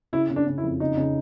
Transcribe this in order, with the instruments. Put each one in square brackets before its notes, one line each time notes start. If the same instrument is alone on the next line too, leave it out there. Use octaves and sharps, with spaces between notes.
[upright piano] C#3 [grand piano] E4
[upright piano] C#3
[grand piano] D4
[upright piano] C#3
[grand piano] E4
[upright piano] F2
[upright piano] C#3 [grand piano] D#4
[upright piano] C#3